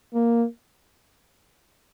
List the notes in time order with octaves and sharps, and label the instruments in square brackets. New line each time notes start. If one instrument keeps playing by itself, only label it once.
[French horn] A#3